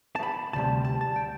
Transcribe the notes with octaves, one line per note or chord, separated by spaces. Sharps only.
A5
B5
D2 C3 G3 A5
A5
A5
G5